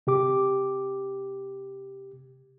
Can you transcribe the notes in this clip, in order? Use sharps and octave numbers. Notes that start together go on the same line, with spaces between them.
C3 G4 D6